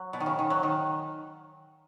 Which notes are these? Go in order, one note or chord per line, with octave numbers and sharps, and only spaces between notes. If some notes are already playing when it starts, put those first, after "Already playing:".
Already playing: F#3
B2
D#3
C#3
D#3
F#3
D#3